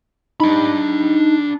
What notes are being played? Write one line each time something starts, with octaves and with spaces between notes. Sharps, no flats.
D4 D#4 B5